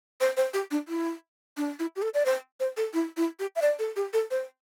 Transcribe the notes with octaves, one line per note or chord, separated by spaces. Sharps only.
C5
C5
G4
D4
E4
D4
E4
G4
A4
D5
C5
C5
A4
E4
E4
G4
E5
D5
A4
G4
A4
C5